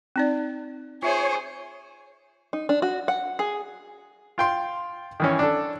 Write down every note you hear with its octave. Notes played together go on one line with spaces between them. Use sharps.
C4 D#4 D5
F4 G#4 C5 C#5 E5
D#4
D4
F#4
F#5
G#4
F4 G5 C6
D#3 E3 C#4
D4 A4